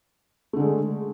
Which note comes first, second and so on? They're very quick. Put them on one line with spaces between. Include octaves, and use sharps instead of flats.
A3 D3 G#3